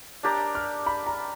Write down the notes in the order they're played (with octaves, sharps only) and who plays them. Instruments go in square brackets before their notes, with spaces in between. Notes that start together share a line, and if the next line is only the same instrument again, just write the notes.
[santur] D4 G4 A#4 D5
[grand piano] F6
B5
A#5